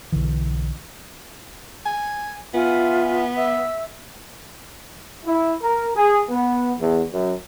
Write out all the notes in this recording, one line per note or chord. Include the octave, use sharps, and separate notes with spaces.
B1 D3 E3
G#5
B3 F4 E5 G#5
E5 E6
E4
A#4
G#4
B3
E2
F#2